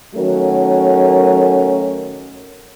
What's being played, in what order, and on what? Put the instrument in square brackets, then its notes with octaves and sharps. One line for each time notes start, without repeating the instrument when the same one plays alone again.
[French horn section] D#3 F#3 A3 C#4 F#4 A#4